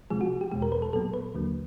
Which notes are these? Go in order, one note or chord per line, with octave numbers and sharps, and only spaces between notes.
C3 F3 G#3 G#4
F#4
G4
E2 B2 G#3 G4
A#4
B4
A4
A#2 F#3 B3 A4
B4
D#2 D3 F#3 A#3